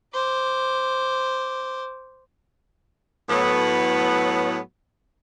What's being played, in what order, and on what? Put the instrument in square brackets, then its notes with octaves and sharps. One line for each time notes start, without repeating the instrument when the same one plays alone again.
[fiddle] C5 D6
[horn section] A2 F#3 B3